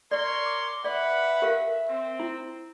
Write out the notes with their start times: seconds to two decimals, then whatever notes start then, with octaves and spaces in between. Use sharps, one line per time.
0.11 A#4 C#5 D5 C6
0.45 D6
0.84 B4 D5 E5 F#5
1.42 G4 A#4 F5
1.89 C4
2.20 E4